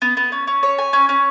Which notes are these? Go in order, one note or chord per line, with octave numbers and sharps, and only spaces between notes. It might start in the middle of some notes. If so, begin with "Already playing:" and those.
B3
B3
C#4
C#4
C#5
G#5
C#4
C#4